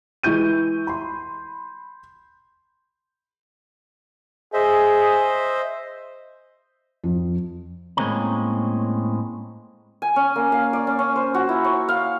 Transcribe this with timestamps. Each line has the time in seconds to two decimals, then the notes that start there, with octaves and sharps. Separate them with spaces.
0.23 E3 G#3 E4 C#6 G6 D#7
0.87 B5 C6
4.53 G#4 C5 D#5 E5
7.04 F2
7.97 A2 G#3 A#3 C4 C#4 A#5
10.02 G#5
10.16 C#4
10.36 A#3
10.52 F5
10.73 D5
10.87 C#4
10.99 C#4
11.16 C5
11.34 F#4
11.49 E4
11.64 C#5
11.89 F5